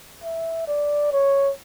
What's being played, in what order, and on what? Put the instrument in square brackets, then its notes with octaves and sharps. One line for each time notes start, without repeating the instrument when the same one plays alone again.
[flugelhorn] E5
D5
C#5